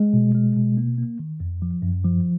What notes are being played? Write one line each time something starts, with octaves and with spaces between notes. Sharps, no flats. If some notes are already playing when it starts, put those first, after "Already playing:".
Already playing: G#3
B2
G#3
B2
A#3
A#3
D#3
F2
F3
F#2
F3